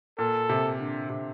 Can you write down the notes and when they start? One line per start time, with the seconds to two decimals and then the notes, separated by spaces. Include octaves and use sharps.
0.19 A#2 A4
0.49 C3
0.79 D3
1.10 C3